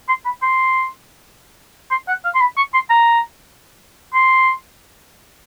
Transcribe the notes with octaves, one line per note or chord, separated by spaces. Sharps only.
C6
B5
C6
C6
F#5
F5
C6
B5
C#6
C6
A#5
C6